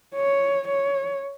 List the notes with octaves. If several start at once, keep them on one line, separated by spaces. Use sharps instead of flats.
C#5
C#5